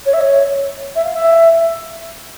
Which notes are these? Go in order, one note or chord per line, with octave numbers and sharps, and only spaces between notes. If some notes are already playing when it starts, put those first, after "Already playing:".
C#5
E5
C#5
E5
F5
E5